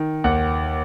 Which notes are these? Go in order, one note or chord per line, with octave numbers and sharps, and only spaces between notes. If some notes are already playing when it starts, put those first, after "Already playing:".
Already playing: D#3
D#2 F#5